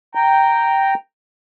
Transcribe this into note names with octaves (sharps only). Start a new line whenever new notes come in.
G5 A#5